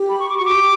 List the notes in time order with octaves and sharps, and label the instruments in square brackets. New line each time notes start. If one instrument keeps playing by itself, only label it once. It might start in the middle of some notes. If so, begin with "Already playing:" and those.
Already playing: [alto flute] G4
[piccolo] B5
C#6
D6
[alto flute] F#4 [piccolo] C#6
[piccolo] D6
[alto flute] G4